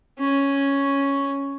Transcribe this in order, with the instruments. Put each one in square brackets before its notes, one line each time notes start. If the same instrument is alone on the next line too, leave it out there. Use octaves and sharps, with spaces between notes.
[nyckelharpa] C#4